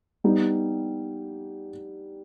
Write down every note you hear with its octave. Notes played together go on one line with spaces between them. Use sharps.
G3 B3 D#4